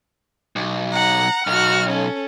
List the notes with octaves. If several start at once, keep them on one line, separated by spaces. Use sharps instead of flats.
B1
F#5 A#5
B1 F#4 F6
C#4 A4